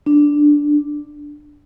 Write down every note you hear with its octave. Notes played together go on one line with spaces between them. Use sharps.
D4